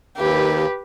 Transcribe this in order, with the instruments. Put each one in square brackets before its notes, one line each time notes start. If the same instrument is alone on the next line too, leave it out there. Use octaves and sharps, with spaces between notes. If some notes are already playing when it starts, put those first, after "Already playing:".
[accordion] D#2 [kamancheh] G4 B4